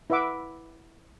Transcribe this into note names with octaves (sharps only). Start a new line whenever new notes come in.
E4 B4 E5 F#5 D6